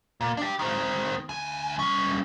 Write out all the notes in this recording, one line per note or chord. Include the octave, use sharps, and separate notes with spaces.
A#2
D4 G4
D#3 C4
D2 G#5
G3 C#4